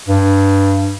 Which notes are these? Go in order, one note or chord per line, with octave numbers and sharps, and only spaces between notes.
G2